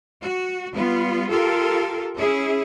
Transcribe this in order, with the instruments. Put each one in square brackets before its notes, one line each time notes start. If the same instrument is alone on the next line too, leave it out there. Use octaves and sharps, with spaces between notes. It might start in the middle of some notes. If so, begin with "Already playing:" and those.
[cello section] F#4
G3 B3 F4
F4 G4 A4 A#4
C#4 E4 G#4